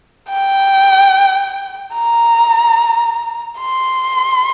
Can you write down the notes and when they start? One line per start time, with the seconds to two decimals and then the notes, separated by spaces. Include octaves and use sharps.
0.29 G5
1.94 A#5
3.60 C6